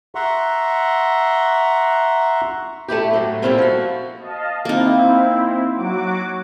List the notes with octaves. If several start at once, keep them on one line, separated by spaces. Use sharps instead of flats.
E5 F#5 A#5 C6 C#6
A3 B3 E4 G4
A2 F#3
A#2 G3 C4 C#4 E4
F3 F#4
D#5 F5 A5
A#3 C4 D#4 E4
F#3 F#4 D6